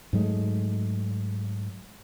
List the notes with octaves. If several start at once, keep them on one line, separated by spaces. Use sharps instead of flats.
G#2 F#3 G#3 A3